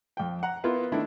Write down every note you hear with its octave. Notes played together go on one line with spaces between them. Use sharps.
F2 G5
F#5 A#5
B3 E4 F4 A#4 B4
D#3 A3 D4 E4